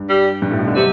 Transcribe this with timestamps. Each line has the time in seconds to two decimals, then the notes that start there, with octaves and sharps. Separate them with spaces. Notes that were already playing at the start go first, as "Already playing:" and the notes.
Already playing: G2
0.09 G3
0.42 G2
0.51 A2
0.59 B2
0.68 D3
0.75 C3 F#3